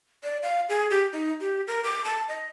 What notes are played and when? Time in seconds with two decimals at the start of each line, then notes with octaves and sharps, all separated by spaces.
0.23 D5
0.43 F5
0.69 G#4
0.90 G4
1.13 D#4
1.41 G4
1.67 A#4
1.84 D6
2.04 A5
2.29 D#5